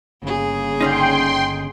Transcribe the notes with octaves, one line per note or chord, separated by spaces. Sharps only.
G1 C#3 A#3 G#4
D3 C#4 D#4 G5 C6